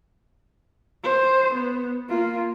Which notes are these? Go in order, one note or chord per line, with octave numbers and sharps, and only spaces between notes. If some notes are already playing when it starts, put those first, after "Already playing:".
C5
B3
A#3 F4